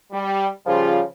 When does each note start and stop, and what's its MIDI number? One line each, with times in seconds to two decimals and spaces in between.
0.12 0.48 55
0.66 1.01 49
0.66 1.01 53
0.66 1.00 55
0.66 1.00 65